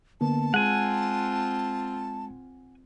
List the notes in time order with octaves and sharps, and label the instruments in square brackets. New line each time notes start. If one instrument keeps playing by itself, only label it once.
[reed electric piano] D3 A#3 B3 [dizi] A5
[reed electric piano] G#3 [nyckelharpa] C4 F4 [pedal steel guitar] F#5 G#5